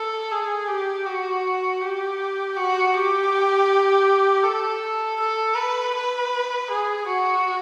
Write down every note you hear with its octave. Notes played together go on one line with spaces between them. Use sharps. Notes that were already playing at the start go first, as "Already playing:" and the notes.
Already playing: A4
G#4
G4
F#4
G4
F#4
G4
A4
A4
B4
B4
G#4
F#4